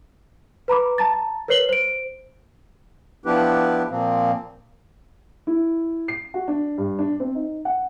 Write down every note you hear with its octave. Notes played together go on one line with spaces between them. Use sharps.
B4 A#5 B5 D6
A5 A#5 A6
A#4 B4 C#5 C7 F#7 G7
C5 D7
F3 B3 D4 E4 G4 B4
A#2 F3 A#3 C4
E4
C7
F#4
D4
G2
D4
C4
D#4
F#5